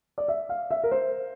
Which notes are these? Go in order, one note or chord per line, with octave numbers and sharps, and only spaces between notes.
D5
E5
F5
E5
A#4
C5